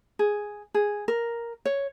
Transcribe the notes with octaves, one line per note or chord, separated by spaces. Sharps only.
G#4
G#4
A#4
C#5